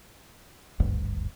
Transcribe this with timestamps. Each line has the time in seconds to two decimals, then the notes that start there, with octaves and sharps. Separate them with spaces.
0.80 D#1 G#1 D2 G2